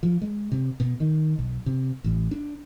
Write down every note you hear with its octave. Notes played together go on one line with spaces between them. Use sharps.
F3
G#3
C3
B2
D#3
B1
C3
A1
D4